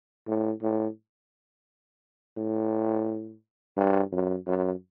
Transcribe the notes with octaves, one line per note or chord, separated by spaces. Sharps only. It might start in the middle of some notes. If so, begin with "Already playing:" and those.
A2
A2
A2
G2
F#2
F#2